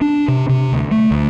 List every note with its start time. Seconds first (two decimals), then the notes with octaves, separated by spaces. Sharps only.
0.01 D4
0.28 C3
0.49 C3
0.72 D2
0.91 A3
1.11 D2